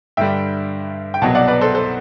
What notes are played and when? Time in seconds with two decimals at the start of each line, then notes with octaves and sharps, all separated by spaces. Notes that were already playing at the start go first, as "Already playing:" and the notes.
0.17 G2 D3 G3 E5 G5
1.14 G5
1.22 C2 B2 F#3 F#5 A5
1.35 D5 F#5
1.47 B4 D5
1.61 A4 C5
1.75 A4 C5